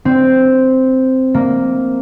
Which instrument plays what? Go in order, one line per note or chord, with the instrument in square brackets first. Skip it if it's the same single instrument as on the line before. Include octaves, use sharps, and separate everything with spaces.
[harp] C4
A#3